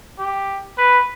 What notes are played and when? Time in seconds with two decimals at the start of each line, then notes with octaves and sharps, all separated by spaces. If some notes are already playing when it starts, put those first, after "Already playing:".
0.19 G4
0.78 B4